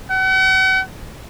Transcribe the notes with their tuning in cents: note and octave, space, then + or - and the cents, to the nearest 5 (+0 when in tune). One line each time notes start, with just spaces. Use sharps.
F#5 +40